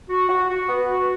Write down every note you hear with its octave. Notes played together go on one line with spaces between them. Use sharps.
F#4
F#4
F#4
B3
F#4